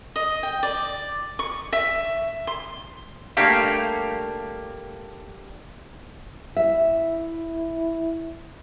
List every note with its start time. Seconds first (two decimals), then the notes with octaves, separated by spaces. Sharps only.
0.16 D#5
0.43 G5
0.63 D5
1.39 C#6
1.73 E5
2.47 C6
3.37 G3 A3 A#3 D4 G4 F5
6.56 E4 E5